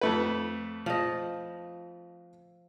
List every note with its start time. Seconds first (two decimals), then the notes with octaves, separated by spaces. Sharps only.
0.01 F2 A3 B4
0.86 F3 D#5